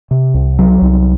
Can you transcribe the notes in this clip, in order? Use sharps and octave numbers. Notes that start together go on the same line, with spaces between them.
C3
C2
F#3
C2